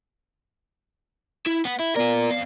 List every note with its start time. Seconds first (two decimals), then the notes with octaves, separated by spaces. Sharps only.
1.46 E4
1.65 B3 F#5
1.80 E4
1.96 B3 F4 A#4 D5
2.31 F2 F5